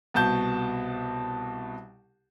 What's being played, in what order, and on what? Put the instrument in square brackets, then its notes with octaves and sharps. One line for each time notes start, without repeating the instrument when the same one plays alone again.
[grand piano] C2 B2 A5 G6